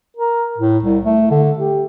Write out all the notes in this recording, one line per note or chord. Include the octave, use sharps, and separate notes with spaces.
A#4
A2
C2
A3
D3
G4